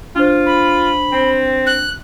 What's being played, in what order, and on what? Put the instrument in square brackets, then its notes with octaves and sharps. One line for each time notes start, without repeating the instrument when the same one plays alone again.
[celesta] D4 C5 [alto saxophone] F4
[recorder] B5
[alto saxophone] C4
[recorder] F#6